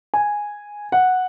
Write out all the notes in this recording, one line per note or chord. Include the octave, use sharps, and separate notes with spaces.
G#5
F#5